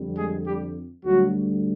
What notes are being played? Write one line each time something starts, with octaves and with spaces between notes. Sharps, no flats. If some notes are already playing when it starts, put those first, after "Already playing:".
Already playing: F2 D3 G3
G#3 G#4
G3 G4
D2 D3 F#3 G3 F#4